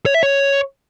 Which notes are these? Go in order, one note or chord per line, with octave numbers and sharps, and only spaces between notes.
C#5
E5
C#5